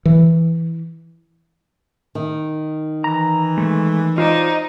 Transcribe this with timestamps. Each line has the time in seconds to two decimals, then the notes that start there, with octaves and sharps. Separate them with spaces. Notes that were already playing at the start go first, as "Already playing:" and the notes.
0.05 E3
2.15 D#3
3.04 E3 A#5
3.58 G#3 A3
4.18 D#4 F4 C5 D5